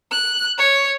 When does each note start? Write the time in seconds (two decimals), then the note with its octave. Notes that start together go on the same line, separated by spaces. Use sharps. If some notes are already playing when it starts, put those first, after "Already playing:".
0.12 F#6
0.58 C#5